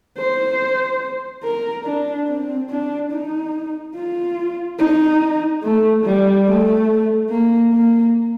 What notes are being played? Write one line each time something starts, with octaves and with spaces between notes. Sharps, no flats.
C5
A#4
D4
C4
D4
D#4
F4
D#4
A3
G3
A3
A#3
A#3